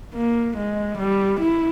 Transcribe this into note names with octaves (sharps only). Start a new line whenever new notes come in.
A#3
G#3
G3
E4